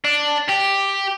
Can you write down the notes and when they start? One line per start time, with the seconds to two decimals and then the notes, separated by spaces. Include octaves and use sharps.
0.05 D4
0.49 G4